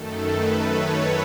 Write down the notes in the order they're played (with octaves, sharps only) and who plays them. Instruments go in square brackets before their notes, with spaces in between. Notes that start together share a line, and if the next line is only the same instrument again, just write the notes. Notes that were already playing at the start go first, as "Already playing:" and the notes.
Already playing: [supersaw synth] F#2 D#3 A3 A4
B4
C#5